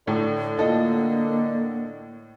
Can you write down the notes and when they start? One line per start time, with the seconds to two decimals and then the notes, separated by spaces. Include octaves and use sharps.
0.07 A2 D3 A4
0.57 A#3 F4 A4 D#5